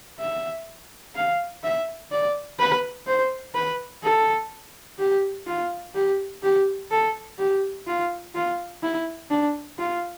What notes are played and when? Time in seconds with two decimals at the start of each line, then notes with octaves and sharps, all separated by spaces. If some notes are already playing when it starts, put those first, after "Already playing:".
0.19 E5
1.15 F5
1.64 E5
2.11 D5
2.59 B4
3.07 C5
3.55 B4
4.03 A4
4.99 G4
5.47 F4
5.95 G4
6.43 G4
6.91 A4
7.38 G4
7.87 F4
8.35 F4
8.83 E4
9.30 D4
9.79 F4